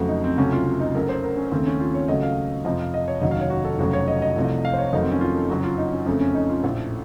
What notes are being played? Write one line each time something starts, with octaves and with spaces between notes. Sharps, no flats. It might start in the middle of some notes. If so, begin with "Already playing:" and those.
Already playing: F2 C#3 F#3 A3 F#4
D#4
C4
C#2 C3 F#3 A3 C#4
F4
C#4
D#4
F#1 F#2 C#3 A3 A#4
C5
A#4
C#4
D#2 C#3 A3 C4
C#4
F4
C#5
C#2 C#3 F#3 A3 D#5
F5
F2 C3 F3 D#5
F5
D#5
C#5
F1 D#2 C#3 F#3 D#5
F5
C#5
F#4
A4
F1 F2 C#3 F#3 A3 F#4
C#5
D#5
D#5
C2 C3 F3 A3
F5
C5
C#5
F2 D#3 F#3 A3 D#4
C4
C#4
F4
A4
F#1 F#2 C#3 F#3 F#4
F4
D#4
C#4
F2 C#3 A3 C4
C#4
D#4
F4
A#1 A2 A3 A4